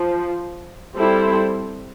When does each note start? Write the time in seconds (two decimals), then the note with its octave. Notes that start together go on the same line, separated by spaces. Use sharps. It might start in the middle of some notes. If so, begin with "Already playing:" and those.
Already playing: F3
0.96 G3 C4 E4 A4 C5